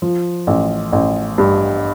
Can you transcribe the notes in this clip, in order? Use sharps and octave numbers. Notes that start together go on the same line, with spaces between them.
F3
A1
A1
G2